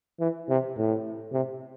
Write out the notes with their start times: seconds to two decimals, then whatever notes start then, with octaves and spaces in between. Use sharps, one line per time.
0.20 E3
0.49 C3
0.77 A2
1.32 C3